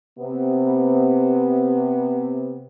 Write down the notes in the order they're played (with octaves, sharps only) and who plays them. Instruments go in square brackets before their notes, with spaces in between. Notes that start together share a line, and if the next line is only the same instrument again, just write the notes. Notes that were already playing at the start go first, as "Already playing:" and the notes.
[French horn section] C3 B3